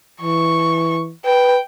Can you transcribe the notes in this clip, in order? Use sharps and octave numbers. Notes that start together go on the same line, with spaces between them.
E3 C#6
B4 G5